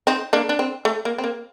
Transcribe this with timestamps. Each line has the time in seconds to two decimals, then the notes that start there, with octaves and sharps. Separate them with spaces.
0.07 C4 D#4
0.33 A#3 D4
0.49 D4
0.59 C4
0.85 A3
1.05 A#3
1.18 C4
1.24 A#3